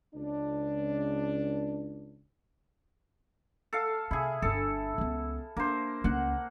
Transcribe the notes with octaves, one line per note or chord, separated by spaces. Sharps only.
C#2 D4
A4 F5
C3 E4 G#4
G1 D4 A4
C#2 B3
A#3 D4 C5
C#2 A#3 F#5